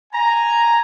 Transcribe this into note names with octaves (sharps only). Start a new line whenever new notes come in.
G#5 A#5